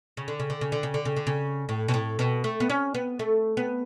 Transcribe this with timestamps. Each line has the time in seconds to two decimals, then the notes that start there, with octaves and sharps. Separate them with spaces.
0.17 C#3
0.28 D3
0.40 C#3
0.50 D3
0.61 C#3
0.72 D3
0.83 C#3
0.94 D3
1.05 C#3
1.16 D3
1.27 C#3
1.69 A2
1.88 B2
1.94 A2
2.19 B2
2.44 A3
2.60 B3
2.70 C#4
2.94 B3
3.19 A3
3.57 B3